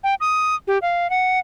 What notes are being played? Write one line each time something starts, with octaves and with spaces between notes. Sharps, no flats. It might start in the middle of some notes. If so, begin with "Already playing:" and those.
G5
D#6
G4
F5
F#5